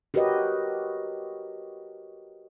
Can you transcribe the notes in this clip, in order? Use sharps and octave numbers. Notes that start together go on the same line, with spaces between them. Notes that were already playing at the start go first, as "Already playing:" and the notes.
F#4 G4 A#4 B4 C#5 D#5